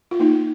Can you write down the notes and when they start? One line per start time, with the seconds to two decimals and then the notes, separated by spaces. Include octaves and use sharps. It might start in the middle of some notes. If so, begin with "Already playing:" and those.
0.11 F4
0.20 A#3 D#4